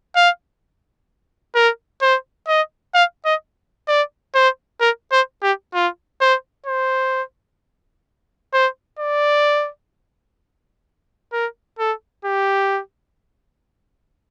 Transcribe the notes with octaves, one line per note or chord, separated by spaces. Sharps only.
F5
A#4
C5
D#5
F5
D#5
D5
C5
A#4
C5
G4
F4
C5
C5
C5
D5
A#4
A4
G4